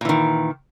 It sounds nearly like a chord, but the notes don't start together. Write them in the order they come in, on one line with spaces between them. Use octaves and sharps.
A#2 E3 D#3